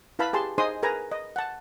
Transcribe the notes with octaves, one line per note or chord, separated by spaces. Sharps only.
E4 B4 F5 A5 B5
G4 G#4 A5 C6
D#4 G#4 C5 D#5 C6 D#6
G#4 A#4 B4 G#5 A#5
D#5
F#5 A5